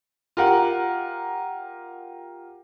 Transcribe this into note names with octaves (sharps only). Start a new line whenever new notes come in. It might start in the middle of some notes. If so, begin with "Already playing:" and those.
F4 G4 A#4 F#5